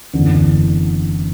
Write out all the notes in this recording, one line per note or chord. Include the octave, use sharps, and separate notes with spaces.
F#1 E2 D3